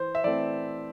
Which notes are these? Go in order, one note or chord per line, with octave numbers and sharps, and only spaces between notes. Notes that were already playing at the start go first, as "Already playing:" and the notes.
Already playing: E3 C5
E5
E3 A3 C4 D5